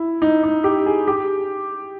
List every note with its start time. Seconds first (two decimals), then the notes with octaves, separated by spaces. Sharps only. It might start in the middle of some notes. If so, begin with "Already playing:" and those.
Already playing: E4
0.22 D#4
0.43 D#4
0.64 G4
0.86 G#4
1.07 G4